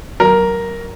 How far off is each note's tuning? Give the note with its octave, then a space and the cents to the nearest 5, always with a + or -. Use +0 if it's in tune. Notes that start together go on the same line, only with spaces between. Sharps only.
F#3 +25 A#4 +0